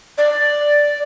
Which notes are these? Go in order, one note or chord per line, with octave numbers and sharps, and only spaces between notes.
D5